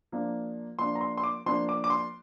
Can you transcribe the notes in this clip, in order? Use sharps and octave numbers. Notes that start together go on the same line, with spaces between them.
F3 A#3 D4
F3 A#3 D4 C6
A#5
C6
C6
D6
F3 A#3 D4 C6
D6
D6
C6